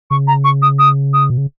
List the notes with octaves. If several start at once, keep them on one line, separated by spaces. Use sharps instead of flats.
C#3 C#6
A#5
C#6
D#6
D#6
D#6
B2
C#3